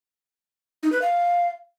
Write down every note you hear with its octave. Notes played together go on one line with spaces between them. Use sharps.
D#4
B4
F5